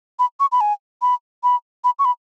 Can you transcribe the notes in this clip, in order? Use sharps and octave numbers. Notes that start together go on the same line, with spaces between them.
B5
C#6
B5
G#5
B5
B5
B5
C#6
B5